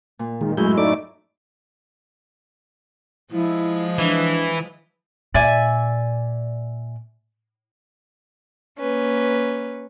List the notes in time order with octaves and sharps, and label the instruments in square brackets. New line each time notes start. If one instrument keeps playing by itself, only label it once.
[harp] A#2
[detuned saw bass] D#3 [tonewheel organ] G#3
[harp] F#2 A2 E4 [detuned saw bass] G#3 [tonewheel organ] G6
[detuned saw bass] A3 [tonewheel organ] D#4 D5 D6
[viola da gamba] F3 G#3 [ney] E4
[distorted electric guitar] E3 [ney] D4
[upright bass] A#2 [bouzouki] D5 E5 G#5
[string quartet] A#3 C#4 B4